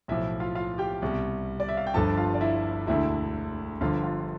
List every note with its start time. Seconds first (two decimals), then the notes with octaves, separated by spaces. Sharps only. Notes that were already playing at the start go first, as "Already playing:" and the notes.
0.08 B1 A2 F3 E4 E5
0.40 F4 F5
0.55 F4 F5
0.78 G4 G5
1.02 C2 B2 G3
1.60 D5
1.69 E5
1.77 F5
1.87 G5
1.94 G1 G2 F3 A4 A5
2.17 F4 F5
2.34 D5
2.41 E4 E5
2.87 E1 D2 D3 E4 E5
3.81 G1 G2 D3 F3 F4 F5
4.04 F4 F5